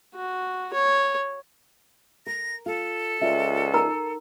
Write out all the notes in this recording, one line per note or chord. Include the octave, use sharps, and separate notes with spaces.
F#4
C#5
A#4 A#6
F4 A4
C#2 F4 D5 E5
D#4 A#4 A#5